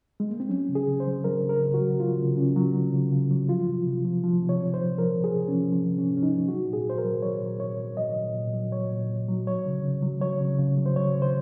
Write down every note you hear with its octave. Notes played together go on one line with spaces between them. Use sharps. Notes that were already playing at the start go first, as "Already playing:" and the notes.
G#3
A#3
C4
F#3 C#4
C#3
G#4
C#3
C5
F#3
F#3 A#4
C#3
A#4
C#3
F#4
F#3
F#3 F4
C#3
C#3 C#4
F#3
F#3
C#3
C#3
F#3
F3 F4
C3
C3
F3
F3
C3
C#5
C3
C5
F3
F3 A#4
C3
G#4
C3
C#4
F3
F3
C3
C#4
C3
C#4
D#4
F3
F#3 F#4
A#2
G#4
A#2 C5
A#4
F#3
F#3 C#5
A#2
A#2 C#5
F#3
F#3 D#5
A#2
A#2
F#3
F#3 C#5
A#2
A#2
F#3
F#3 C#5
C#3
C#3
F#3
F#3 C#5
C#3
C#3
F#3
C5
F#3 C#5
C#3
C5